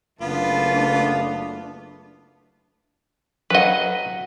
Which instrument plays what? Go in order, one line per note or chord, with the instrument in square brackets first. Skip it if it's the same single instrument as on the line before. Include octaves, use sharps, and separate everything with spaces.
[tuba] F#1 [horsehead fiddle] A3 D4 [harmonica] B3 F4
[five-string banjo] F#3 F#5 [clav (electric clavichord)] B4 D#5